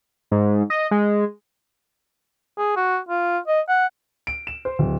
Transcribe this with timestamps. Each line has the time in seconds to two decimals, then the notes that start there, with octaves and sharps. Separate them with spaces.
0.31 G#2
0.70 D#5
0.91 G#3
2.58 G#4
2.76 F#4
3.09 F4
3.47 D#5
3.69 F#5
4.27 D7
4.47 E7
4.65 C5
4.79 D1